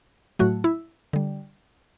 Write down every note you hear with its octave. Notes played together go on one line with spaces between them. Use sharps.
A2 F#3 A3 F#4
E4
D3 G3